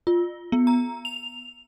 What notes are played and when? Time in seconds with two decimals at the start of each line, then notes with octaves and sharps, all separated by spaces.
0.07 F4
0.52 B3
0.67 A#5
1.05 F7